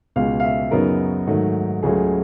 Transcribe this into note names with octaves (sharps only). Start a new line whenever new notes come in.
C#2 B2 G#3 F5
F5
E5
F#2 C#3 F#3 B3 D#4 A#4
G#2 D#3 F#3 A3
C#2 C#3 F#3 A3 G#4